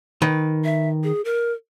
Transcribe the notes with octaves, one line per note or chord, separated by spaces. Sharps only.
D#3 B4
E5
G#4
A#4